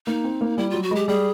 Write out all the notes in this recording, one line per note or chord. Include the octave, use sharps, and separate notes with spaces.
A#3 D#4
C4
A#3
G3 E4
F#3 F4
F#4
G#3 G4
G3 G#4